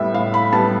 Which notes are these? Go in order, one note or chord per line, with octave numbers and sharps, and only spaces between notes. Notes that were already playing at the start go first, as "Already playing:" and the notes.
Already playing: A2 G3 B3 E5
A2 F5
B5
G3 B3 A5